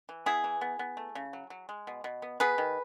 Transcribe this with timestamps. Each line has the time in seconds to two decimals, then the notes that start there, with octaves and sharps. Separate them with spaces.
0.09 E3
0.26 B3 E4 G#4
0.44 E3
0.61 B3
0.79 B3
0.97 A3
1.15 C#3
1.33 F#3
1.50 F#3
1.69 G#3
1.87 B2
2.04 B2
2.22 B3
2.40 B3 G#4 B4
2.58 D#3